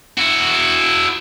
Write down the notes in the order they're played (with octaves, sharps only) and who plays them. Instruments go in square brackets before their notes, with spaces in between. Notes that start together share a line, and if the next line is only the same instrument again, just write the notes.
[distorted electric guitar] E4 F#4